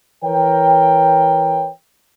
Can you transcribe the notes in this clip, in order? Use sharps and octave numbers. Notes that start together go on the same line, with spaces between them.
E3 A#4 B4 C#5 G5